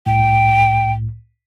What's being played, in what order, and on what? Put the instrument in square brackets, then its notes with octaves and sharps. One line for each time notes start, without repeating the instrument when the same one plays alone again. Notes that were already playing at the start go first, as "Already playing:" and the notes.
[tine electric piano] C2 A2 [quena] G5